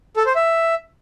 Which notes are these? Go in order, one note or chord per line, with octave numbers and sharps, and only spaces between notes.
A4
C5
E5